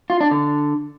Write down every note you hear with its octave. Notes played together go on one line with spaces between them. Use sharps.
F4
D4
D3